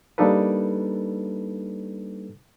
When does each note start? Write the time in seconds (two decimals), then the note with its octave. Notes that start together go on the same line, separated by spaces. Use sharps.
0.18 G3 A#3 D4 D#4 A4 B4